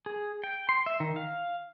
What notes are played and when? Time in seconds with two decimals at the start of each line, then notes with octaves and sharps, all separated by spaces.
0.06 G#4
0.44 G5
0.69 C6
0.86 E5
1.00 D#3
1.16 F5